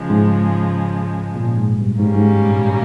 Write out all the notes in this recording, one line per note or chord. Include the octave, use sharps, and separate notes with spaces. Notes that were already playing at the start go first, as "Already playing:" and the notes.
Already playing: C#3 F3 G#3
G#2
A#2
G#2
G2
G#2 D#3 G3 A#3 C#4
G#2
G2
A#2